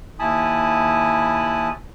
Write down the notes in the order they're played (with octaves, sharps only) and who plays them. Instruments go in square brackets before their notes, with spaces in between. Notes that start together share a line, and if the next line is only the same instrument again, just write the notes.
[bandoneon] D#2 E4 G#5 A5 B5 D#6